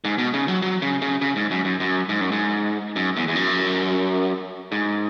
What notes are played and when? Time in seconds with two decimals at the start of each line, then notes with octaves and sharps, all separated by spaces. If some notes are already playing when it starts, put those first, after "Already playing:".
0.05 G#2
0.18 B2
0.34 C#3
0.48 F#3
0.62 F#3
0.82 C#3
1.02 C#3
1.22 C#3
1.36 G#2
1.51 F#2
1.65 F#2
1.80 F#2
2.09 G#2
2.21 F#2
2.32 G#2
2.96 F#2
3.17 E2
3.28 E2
3.36 F#2
4.72 G#2